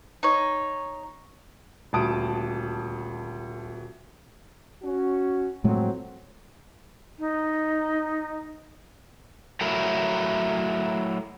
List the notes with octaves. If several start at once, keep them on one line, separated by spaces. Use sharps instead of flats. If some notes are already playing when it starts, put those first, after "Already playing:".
D#4 C#5
D#1 D2 A5 D#6 D7
C#4 F#4
F2 A2 F#3 G#3 A3 C4
D#4
F#3 A3 E4 A#4